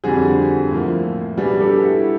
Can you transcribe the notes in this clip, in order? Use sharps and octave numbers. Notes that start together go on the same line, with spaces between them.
F2 D3 G3 C4 F#4 G#4
A2 F3 A#3
B2 G3 B3 D4 F#4 G#4
G4 A4
E4 F#4